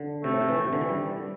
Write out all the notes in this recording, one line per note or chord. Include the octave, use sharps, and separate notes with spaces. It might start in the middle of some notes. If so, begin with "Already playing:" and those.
Already playing: D3
C3 A3
A2
C3
E3
A2
C3
D3
E3
G3